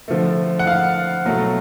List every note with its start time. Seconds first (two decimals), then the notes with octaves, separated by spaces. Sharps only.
0.08 D3 F3 A3
0.59 F#5
0.67 F5
1.26 B2 F#3 A3